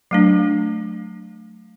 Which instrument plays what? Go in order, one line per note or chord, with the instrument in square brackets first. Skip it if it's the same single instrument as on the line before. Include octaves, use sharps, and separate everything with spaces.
[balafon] F#3 A3 D4